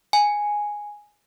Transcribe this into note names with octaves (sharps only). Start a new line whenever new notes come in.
G#5